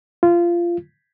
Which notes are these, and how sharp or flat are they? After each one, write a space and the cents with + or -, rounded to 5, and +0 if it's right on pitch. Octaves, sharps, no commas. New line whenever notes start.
F4 -20